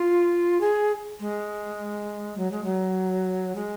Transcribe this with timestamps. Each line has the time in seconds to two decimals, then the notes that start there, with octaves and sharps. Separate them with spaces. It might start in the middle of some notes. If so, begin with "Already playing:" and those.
Already playing: F4
0.61 G#4
1.20 G#3
2.37 F#3
2.52 G#3
2.64 F#3
3.56 G#3